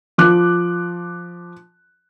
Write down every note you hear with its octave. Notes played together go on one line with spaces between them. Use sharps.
F3 D6 F#6